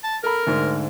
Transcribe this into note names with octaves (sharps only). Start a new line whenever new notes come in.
A5
A4 A#4 A#5 B5
D2 G#2